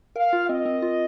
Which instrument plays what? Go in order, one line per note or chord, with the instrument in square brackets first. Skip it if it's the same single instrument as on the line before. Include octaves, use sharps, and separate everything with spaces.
[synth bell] A#4 [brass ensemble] F5
[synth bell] F4
[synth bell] C4 [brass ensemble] D#5
[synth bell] C4
F4